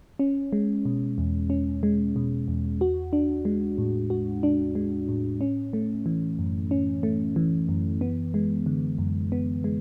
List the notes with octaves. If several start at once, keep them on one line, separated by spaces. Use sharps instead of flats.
C#4
G#3
B2
E2
C#4
G#3
B2
E2
F#4
D4
G#3
A2
F#4
D4
G#3
A2
C#4
A3
E3
F#2
C#4
A3
E3
F#2
B3
G#3
D3
F#2
B3
G#3